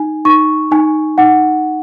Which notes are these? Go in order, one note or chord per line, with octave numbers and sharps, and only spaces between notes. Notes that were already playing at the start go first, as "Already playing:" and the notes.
Already playing: D#4 G#5
D#4 C#6
D#4 G#5
D#4 F#5